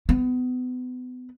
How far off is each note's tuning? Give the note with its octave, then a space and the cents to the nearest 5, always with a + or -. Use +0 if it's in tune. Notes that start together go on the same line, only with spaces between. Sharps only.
B3 +30